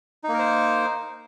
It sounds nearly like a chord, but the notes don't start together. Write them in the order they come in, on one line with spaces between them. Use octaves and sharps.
D#4 A#3 A#4 C5